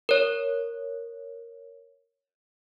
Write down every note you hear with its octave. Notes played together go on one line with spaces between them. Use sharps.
A#4 C#5